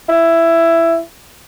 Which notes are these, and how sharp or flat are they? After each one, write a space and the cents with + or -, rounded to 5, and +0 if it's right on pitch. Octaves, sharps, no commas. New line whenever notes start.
E4 +10